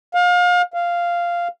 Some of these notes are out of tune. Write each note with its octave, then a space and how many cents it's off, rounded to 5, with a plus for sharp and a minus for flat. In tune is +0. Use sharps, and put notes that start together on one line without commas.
F5 +35
F5 -5